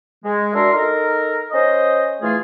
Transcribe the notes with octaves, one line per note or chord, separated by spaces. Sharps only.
G#3
D4 F#4 A#4 E5 C6
D#4 A4 A#4
C#4 C5 D#5
E3 A3 F4 G#4